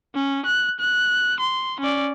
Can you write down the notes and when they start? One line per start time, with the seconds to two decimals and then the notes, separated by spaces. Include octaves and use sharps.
0.15 C#4
0.46 F#6
0.80 F#6
1.40 C6
1.80 C#4 D5